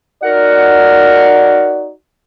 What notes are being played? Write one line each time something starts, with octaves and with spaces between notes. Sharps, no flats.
D#4 F#4 A#4 D5 F#5